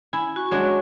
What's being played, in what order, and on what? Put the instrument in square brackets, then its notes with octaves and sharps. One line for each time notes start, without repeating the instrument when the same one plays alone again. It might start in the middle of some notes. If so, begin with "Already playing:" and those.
[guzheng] E4 [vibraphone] G#5
[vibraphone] F#4 C#6
[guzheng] F#3 G#3 D4